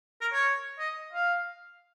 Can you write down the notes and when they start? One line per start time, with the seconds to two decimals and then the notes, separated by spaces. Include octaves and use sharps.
0.21 A#4
0.32 C#5
0.79 D#5
1.13 F5